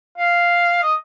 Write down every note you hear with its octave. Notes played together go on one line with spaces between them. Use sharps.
F5
D#5